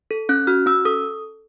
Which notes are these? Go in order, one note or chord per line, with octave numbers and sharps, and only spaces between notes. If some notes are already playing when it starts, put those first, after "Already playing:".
A4
C#4 F#6
F#4 F6
C#4 E6
A4 D#6